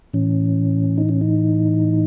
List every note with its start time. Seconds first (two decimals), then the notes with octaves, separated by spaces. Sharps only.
0.14 A2 E3 C#4
0.98 D#4
1.09 C#4
1.21 D#4